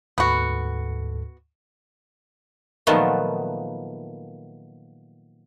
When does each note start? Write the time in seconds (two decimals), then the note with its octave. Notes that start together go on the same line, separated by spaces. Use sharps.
0.18 D2 G#2 B3 F#4 A4
2.87 A#2 D#3 F3 F#3 A3 B3